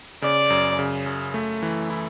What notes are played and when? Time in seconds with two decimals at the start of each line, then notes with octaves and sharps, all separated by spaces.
0.22 C#3 D5
0.50 F#2
0.79 C#3
1.06 F#2
1.34 A3
1.63 E3
1.90 E4